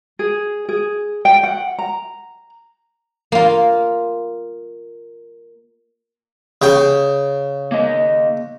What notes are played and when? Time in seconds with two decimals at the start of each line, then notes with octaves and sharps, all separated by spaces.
0.19 G#4
0.69 G#4
1.25 G5
1.43 F#5
1.78 A#5
3.32 A#3 F4
6.62 C#3 G5
7.72 A#3 D#5